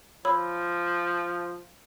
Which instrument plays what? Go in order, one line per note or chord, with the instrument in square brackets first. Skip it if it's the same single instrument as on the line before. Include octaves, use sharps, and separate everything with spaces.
[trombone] F3 [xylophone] C#5 B5 E6